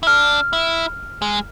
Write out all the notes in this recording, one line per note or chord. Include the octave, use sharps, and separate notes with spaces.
E4
D4 F6
E4
G#3